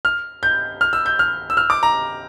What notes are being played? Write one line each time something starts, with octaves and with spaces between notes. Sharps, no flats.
F6
G6
F6
E6
G6
F6
E6
F6
D6
A#5